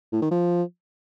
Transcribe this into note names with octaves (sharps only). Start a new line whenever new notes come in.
A2
D#3
F3